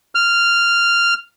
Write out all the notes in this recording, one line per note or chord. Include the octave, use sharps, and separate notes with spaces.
F6